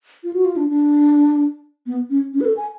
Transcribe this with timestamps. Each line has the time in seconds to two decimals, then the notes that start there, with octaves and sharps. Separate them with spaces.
0.24 F4
0.33 F#4
0.45 F4
0.57 D4
0.69 D4
1.86 B3
2.10 C#4
2.34 C#4
2.41 B4
2.45 A4
2.57 G#5